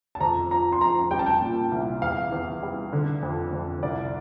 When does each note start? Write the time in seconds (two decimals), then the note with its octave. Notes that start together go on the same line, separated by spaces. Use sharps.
0.15 A5
0.21 F2 A#5
0.51 F3 A#5
0.72 C6
0.81 F3 A#5
1.11 G3 G5
1.19 A5
1.26 G5
1.42 A#2
1.72 C2
2.02 E2 F5
2.32 E2
2.63 G3
2.93 D3
3.23 F2
3.53 F2
3.83 C2 D5